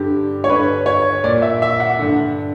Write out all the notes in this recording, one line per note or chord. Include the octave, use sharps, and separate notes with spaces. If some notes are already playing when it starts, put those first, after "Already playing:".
Already playing: G2 D3 G4
C#5
G2 D3 B4
C#5
A#2 D5
E5
E5
F#5
G2 D3